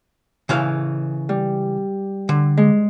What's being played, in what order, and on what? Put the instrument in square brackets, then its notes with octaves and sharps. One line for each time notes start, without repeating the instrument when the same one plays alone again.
[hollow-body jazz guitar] C#3 E3 F5
[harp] G3
[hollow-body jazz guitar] D3
[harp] G#3